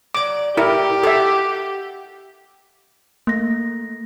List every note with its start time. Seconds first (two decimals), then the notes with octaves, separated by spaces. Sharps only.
0.15 F#3 D5 D6
0.57 A2 E4 G4 A#4
1.03 F#4 A4 E5
3.27 A3 A#3 A#6